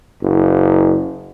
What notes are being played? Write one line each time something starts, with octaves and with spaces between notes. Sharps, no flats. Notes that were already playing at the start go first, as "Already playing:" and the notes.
F#1